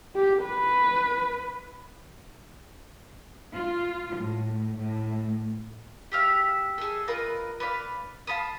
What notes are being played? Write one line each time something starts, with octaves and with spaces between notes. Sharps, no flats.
G4
B4
F4
A2
A2
G4 E5 F5
G#4 A4
F4 A#4 B4 D#5
B4 D5 F5
F5 A5 B5 D#6